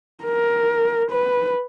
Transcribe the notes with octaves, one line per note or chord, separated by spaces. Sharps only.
A#4
B4